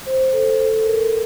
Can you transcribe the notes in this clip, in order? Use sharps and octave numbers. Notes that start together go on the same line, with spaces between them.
C5
A4
A4
A#4